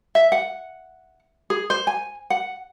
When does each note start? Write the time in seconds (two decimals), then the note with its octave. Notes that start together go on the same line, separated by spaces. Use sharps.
0.15 E5
0.32 F#5
1.50 G#4
1.70 C5
1.87 G#5
2.30 F#5